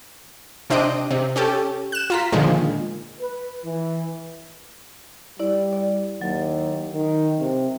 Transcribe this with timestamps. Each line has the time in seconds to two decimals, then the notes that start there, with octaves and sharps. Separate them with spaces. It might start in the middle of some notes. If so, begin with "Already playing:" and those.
0.70 C3 C4 D4 D#5 D7
1.11 C3
1.36 C#4 G4 A4
1.92 F#6 E7
2.10 F4 A#5 B6
2.32 A#2 D3 D#3 F3 G#3
3.20 B4
3.64 E3
5.39 G3 E4 D5
5.73 D5
6.21 D#2 F#3
6.94 D#3
7.40 C3